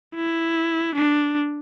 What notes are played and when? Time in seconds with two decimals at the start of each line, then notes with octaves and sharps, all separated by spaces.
0.15 E4
0.95 D4